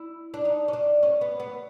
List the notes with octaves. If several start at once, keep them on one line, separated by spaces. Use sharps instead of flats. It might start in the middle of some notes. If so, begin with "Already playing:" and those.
Already playing: E4
D4
D#4
C#4
D4
C#4
B3
B3